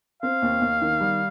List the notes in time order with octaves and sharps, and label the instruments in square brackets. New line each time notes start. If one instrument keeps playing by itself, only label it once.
[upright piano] C4 [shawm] F5
[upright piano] D#2
D#2
D#3
G3